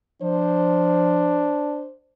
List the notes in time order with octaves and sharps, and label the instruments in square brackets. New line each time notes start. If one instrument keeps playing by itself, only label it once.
[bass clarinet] F3 [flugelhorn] D4 [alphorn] C5